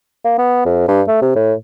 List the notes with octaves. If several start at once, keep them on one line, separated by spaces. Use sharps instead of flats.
A#3
B3
F2
G2
A3
C3
A2